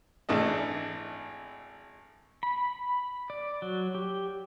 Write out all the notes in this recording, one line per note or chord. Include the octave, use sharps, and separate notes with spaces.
G#1 E3 A3 D4 D#5
B5
D5
F#3
G4